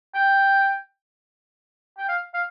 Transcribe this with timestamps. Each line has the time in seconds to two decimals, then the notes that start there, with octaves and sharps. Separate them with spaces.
0.15 G5
1.98 G5
2.09 F5
2.34 F5